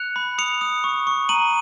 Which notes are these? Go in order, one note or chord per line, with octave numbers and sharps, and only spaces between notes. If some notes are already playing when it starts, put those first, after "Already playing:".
Already playing: F#6 C#7 F7
B5
D#6 C#7 F7
D#6
C#6
C#6
A#5 D#7 F#7